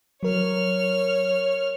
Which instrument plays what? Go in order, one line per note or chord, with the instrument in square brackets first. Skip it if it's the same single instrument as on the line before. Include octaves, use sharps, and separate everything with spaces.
[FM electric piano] F#3 A#4 [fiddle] C#5 F6